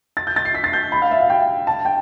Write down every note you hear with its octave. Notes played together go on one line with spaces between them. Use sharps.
A6
G6
A6
C7
B6
A6
G6
B5
F5
E5
F5
G5
A5
G5